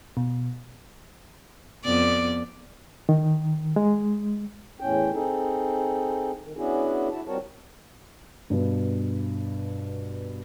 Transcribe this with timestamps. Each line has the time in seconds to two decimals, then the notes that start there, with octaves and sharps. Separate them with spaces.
0.17 B2
1.84 F2 B3 D5
3.09 D#3
3.76 G#3
4.80 E2 A2 C#4 G5
5.14 C4 D#4 G#4 A4
6.44 D#3
6.57 B3 C#4 D4 E4 F#4 G#4
7.11 E4 F#4 A5
7.28 G3 C4 F#4 A#4 C#5 A5
8.50 G2 B2